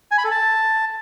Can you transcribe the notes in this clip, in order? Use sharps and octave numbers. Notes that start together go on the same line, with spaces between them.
G#5
B5
A4
A5